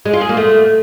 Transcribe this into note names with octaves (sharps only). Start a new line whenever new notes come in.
G#3
F4
G#4
A#3
A3